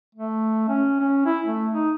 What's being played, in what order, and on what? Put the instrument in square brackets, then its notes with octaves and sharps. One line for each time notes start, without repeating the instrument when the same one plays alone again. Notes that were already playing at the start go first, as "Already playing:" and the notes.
[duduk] A3
C#4
C#4
E4
A3
D#4